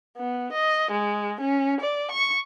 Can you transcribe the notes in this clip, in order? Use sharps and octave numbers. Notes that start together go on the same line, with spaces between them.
B3
D#5
G#3
C#4
D5
C#6